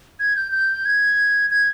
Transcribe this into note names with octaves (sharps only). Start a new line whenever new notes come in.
G#6
G6
G6
G#6
G#6